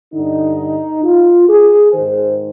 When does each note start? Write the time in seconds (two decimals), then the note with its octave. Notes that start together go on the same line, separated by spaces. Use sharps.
0.14 G2 D3 D#4
1.04 F4
1.49 G#4
1.93 G#2 D#3 C5